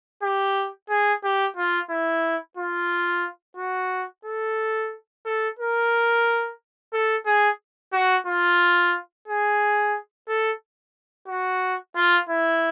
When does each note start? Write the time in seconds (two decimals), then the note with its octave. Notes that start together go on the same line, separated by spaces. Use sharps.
0.23 G4
0.90 G#4
1.24 G4
1.56 F4
1.90 E4
2.57 F4
3.57 F#4
4.25 A4
5.25 A4
5.59 A#4
6.93 A4
7.26 G#4
7.93 F#4
8.27 F4
9.28 G#4
10.28 A4
11.28 F#4
11.96 F4
12.29 E4